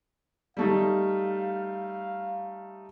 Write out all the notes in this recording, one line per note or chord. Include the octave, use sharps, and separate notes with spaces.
G3 A3 D#4 F5